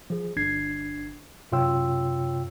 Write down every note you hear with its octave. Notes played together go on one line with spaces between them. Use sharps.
F3 G#4
G1 D4 G#6 C7
F#2 C3 F4 C#5 G5 E6